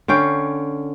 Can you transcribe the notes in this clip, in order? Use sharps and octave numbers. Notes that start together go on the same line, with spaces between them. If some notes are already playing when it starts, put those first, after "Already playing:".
D3 C#4 F5 G5